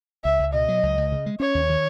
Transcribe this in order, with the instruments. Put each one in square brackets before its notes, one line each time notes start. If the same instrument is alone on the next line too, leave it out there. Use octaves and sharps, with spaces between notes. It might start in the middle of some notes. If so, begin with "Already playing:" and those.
[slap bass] C#2 [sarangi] E5
[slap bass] C#2
[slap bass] B2 [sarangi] D#5
[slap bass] F#3
C#2
C#2
C#3
G#3
[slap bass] C#4 [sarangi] C#5
[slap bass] D#2
D#3